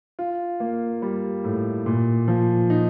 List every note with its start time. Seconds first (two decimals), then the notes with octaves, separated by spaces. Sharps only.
0.19 F4
0.60 A#3
1.02 G3
1.44 A2
1.86 A#2
2.28 F3
2.70 D#4